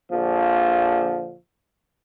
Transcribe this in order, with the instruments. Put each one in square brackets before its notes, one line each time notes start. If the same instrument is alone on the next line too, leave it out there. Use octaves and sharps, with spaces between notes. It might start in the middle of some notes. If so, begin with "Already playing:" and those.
[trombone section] A#1 D3 F3